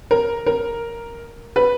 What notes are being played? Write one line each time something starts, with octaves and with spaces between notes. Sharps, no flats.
A#4
A#4
B4